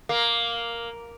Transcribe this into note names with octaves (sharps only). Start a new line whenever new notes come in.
A#3